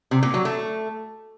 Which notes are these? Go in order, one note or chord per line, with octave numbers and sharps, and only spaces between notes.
C3
A#2
F#3
A3